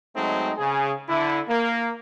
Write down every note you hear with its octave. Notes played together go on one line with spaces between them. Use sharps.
F#3 G#3 A3 C4 D#4
C#3 G#4
D3 E4
A#3